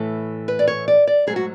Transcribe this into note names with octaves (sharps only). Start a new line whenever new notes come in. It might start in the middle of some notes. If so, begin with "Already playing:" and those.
Already playing: A2 E3 A3 A4
B4
D5
C#5
D5
D5
G#2 F#3 A3 G#4
F#4